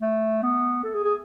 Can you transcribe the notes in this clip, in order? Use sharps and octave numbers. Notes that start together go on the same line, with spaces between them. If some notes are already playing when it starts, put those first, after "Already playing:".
A3
B3
A4
G#4
G#4